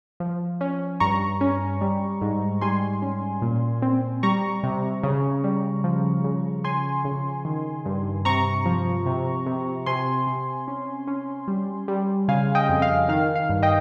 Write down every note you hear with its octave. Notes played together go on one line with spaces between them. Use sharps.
F3
C#4
G2 A#5 C#6
C#4
G3
G#2
G3 G#5 C6
C#4
A#2
C4
G3 A#5 C#6
C3
C#3
G3
F3
C#3
C#3 G#5 C6
C#3
D#3
G2
C3 A#5 C#6
F3
C3
C3
C3 G#5 C6
C3
C#4
C#4
G3
G3
C#3 F5 G#5
D#5 G5
F2
F5
D#3 F5
F5
G2
D#5 G5